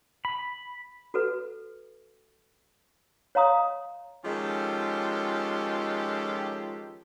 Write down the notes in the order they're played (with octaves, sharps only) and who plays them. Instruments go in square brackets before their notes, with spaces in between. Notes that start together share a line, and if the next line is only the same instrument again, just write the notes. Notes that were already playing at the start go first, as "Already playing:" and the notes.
[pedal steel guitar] B5
[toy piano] F#4 A4 B4
C#5 D#5 F5 A#5 C6 D#6
[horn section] D#3 F3 G#3 C#4 G4 A4